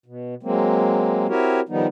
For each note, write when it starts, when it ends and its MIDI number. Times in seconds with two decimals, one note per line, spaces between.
0.06 0.35 47
0.43 1.27 54
0.43 1.27 56
0.43 1.27 58
0.43 1.27 60
1.29 1.60 60
1.29 1.60 64
1.29 1.60 66
1.29 1.60 67
1.29 1.60 70
1.29 1.60 73
1.69 1.87 51
1.69 1.87 53
1.69 1.87 55
1.69 1.87 59
1.69 1.87 63